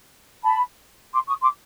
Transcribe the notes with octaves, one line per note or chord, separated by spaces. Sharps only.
A5 B5
C6 D6
C#6 D#6
C6 D6